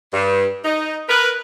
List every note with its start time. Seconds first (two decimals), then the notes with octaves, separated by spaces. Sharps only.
0.14 G2
0.64 D#4
1.09 A#4 B4